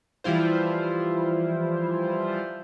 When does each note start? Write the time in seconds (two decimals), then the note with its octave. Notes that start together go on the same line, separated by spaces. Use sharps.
0.24 E3 F3 G3 E4 F4 C5